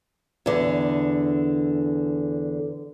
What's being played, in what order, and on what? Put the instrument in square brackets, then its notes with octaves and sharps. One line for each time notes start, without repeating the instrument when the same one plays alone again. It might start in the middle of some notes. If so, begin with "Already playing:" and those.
[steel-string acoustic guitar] E2 D3